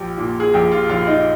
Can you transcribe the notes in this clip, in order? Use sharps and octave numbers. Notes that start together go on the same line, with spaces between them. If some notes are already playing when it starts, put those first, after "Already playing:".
Already playing: A#1 G4
A#2
G#4
A#1 G4
F4
A#1 F4
D#4